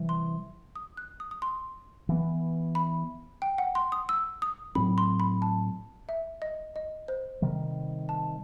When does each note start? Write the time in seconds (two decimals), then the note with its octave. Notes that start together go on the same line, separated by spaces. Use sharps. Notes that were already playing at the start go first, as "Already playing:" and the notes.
Already playing: C3 E3 G3
0.09 C6
0.76 D#6
0.97 F#6
1.20 D#6
1.31 D#6
1.42 C6
2.09 E3 B3
2.75 B5
3.42 G5
3.58 F#5
3.75 C6
3.92 D#6
4.09 E6
4.42 D#6
4.75 A2 F#3 C4 B5
4.98 C6
5.20 B5
5.42 A5
6.09 E5
6.42 D#5
6.76 D#5
7.08 C5
7.42 C3 D#3 G3
8.09 A5